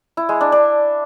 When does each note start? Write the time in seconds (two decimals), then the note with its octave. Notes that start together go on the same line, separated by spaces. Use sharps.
0.17 E4
0.29 G#3
0.41 D4
0.52 D4